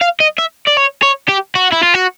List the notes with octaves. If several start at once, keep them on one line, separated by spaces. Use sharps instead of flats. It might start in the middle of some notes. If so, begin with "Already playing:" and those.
F5
D#5
E5
D5
C#5
C#5
G4
F#4
E4
F4
F#4